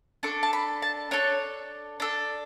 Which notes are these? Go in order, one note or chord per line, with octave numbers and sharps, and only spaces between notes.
D4 A4 C#6
A5
B5
A5
D4 A4 C#5
D4 A4